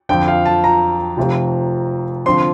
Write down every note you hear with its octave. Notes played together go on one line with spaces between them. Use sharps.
F2 D3 F3 G5
F5
A5
A#5
F1 F2 C3 F3
D3 F3 C4 C6